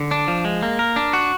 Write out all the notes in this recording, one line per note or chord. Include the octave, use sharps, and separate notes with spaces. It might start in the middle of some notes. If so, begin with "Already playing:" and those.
Already playing: D3
D4
F3
G#3
A#3
A#4
D4
F#4